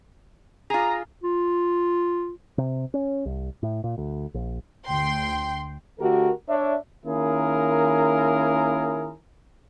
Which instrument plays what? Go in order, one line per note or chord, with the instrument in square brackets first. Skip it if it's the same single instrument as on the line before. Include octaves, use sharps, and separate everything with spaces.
[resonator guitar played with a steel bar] F4 G#4 [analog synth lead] A#5
[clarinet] F4
[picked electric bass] C3
C#4
C2
A2
A#2
D2
A#1
[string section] D2 G5 C6
[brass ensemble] D3 A3 F#4 G4 A4 A#4
D4 C#5 D5 E5
D#3 A#3 C#4 E4 G#4 A#4